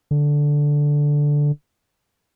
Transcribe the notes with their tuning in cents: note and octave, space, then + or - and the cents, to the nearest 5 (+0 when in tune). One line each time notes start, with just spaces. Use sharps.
D3 -5